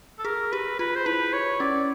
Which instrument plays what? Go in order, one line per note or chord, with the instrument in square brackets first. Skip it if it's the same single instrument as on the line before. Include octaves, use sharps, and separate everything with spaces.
[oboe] A4
[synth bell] G#4 [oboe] A#4
[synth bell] G4 [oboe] B4
[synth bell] F4 [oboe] B4
[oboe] C5
[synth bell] E4 [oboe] B4
[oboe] C#5
[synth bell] C#4 [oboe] D5